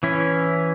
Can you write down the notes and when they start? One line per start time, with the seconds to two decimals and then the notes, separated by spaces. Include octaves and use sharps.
0.03 E3 C#4 E4